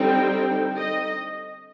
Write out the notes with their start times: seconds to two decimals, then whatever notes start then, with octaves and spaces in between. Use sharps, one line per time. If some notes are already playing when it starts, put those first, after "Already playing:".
Already playing: D3 G3 C4 D#4 G5
0.77 D#5